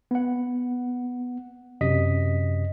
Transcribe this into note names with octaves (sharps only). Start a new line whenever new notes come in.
B3 F#5
F#2 C3 D#5 B6